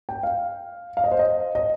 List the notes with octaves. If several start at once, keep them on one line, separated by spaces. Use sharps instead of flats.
G5
F5
F5
D#5
C5
D#5
D#5